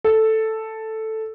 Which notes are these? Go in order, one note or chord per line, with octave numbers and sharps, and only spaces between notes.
A4